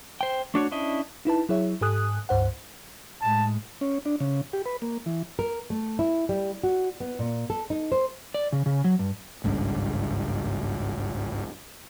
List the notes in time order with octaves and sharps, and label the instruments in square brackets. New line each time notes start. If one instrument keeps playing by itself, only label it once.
[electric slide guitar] C5 G5
A3 D4 F#4 C#5
C#4 D4 E4 D#5
[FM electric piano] D#4 E4 B4 A5
F#3 E4 G#4 C#5 E5
G#2 G4 A4 G#5 D#6 F#6
C#2 G2 C5 F#5
[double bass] A2 G#3 [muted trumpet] A5
[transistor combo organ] C#4
D4
C#3
G4
B4
A#3
E3
[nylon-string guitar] A#4
A3
E4
G3
F#4
B3
A#2
A4
D#4
C5
[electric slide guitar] D5
C#3
C#3
F#3
G2
[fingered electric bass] G#1 C#2 G2 C#3